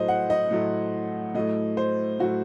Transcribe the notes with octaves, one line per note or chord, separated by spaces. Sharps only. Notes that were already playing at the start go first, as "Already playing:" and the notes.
Already playing: A2 F#3 A3 C5 D#5
F#5
D#5
A2 F#3 A3
A2 F#3 A3 D#5
C5
A2 F#3 A3 F#4